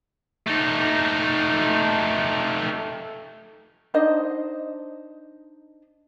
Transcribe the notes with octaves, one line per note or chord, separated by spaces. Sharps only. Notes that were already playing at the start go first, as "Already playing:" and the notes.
A3 D#4
D4 D#4 C5 D#5